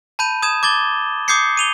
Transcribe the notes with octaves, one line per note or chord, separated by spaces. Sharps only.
A5 B5 G6 D#7
D#6 G#6 E7
D6 G#6 A6 G7
D6 D#6 G6 G#6 C7 C#7
D#7 F7 G7